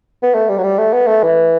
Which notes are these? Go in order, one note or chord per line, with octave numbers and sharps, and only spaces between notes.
B3
A3
G3
F#3
G3
A3
B3
A3
E3